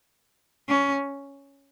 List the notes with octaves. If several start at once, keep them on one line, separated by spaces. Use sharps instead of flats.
C#4